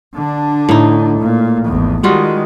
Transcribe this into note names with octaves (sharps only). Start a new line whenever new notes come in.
D3 D4
A2 D#4
A#2
G#1 E2
D#3 G3 G#3 F4 F#4